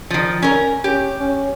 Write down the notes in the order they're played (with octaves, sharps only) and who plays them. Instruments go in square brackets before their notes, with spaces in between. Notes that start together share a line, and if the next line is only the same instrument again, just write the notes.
[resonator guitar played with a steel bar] D#3 F3
[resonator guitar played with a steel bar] C#4 A#4 [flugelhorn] G#5
[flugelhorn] C#4 [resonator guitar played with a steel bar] G4
[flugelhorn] C#4